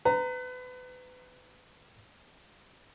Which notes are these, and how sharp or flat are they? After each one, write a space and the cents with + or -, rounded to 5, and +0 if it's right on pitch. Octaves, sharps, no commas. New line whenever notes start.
B4 +30 A#5 -15